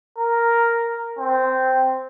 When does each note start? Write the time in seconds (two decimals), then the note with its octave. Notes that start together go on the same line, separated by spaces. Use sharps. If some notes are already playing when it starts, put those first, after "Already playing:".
0.17 A#4
1.18 C4